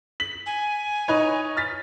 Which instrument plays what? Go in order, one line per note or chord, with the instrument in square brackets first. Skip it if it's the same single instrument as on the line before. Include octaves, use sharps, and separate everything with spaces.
[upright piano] B6 F#7
[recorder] G#5
[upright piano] D#4 B4 C#5
F6 A6 B6